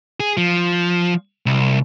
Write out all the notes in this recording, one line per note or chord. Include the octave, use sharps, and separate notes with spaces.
G#4
F3
C2